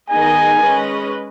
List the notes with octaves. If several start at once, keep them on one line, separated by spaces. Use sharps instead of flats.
D#3 B3 D#4 G#4 D#5 G#5
G#3 C#4 B4 D#5